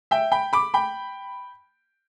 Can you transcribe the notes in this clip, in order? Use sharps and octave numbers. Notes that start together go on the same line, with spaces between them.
E5 G5
G5 B5
B5 D6
G5 B5